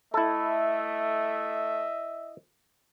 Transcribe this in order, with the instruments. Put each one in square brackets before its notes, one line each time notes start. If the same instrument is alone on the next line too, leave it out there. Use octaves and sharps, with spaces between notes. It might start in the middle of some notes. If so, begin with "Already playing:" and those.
[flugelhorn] A3 [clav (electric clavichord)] E4 A4 [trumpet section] D#5 E5